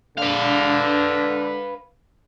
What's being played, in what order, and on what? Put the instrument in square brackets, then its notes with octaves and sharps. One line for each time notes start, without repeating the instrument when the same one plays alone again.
[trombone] D3 [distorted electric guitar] B4 F5